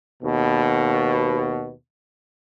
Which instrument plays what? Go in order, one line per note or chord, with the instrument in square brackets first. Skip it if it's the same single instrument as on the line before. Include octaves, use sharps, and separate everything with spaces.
[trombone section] D#2 B2